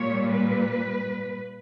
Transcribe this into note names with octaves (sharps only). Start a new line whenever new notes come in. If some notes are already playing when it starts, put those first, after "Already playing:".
Already playing: A#2 G3 C#5
B4